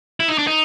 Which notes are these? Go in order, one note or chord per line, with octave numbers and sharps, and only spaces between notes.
E4
D#4
D4
D#4